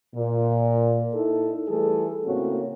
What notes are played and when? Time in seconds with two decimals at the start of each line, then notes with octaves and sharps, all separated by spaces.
0.15 A#2
1.14 D#4 E4 A4
1.68 E3 G3 A3 G#4 A4
2.25 A2 C#3 A#3 C4 C#4 F#4